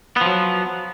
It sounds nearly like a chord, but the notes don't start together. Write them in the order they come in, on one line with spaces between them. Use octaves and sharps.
B3 F3 F#3